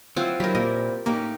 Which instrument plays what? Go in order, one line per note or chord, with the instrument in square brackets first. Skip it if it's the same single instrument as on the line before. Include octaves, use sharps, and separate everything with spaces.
[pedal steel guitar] F#3 E4 [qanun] C4 F4 C5
[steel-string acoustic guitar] F#3 D#4 [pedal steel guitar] C4 E4 [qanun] G4 A#4 [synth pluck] B6
[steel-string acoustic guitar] A#2 [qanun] A#4 [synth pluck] D#5
[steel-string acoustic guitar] A2 D#4 G4 [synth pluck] A#3 [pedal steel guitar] C#4